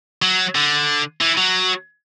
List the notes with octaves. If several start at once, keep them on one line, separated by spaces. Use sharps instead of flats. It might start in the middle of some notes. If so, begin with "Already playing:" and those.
F#3
D3
E3
F#3